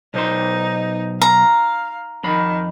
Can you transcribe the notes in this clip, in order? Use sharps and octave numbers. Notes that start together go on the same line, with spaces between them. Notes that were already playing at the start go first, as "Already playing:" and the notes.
B1 D#4 C5 C6
F5 A#5
F2 D#3 B5